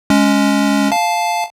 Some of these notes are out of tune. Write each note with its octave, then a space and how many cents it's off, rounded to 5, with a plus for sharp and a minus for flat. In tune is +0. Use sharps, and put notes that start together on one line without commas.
G#3 +0 C#4 +10
F5 +0 A5 -15